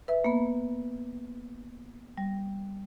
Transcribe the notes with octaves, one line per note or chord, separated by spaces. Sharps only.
B4 E5
A#3 B3
G3